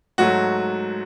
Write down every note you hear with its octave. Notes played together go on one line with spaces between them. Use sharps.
G#2 F#3 A3 F#4